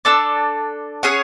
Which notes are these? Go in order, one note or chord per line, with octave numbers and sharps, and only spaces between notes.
D4 A4 D5
C#4 G#4 C#5 F#5